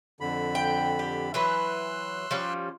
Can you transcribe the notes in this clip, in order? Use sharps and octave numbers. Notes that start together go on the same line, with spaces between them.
F2 D3 B5
G5
G4
E3 F#3 B4 C6 E6 F#6
F3 G3 C#4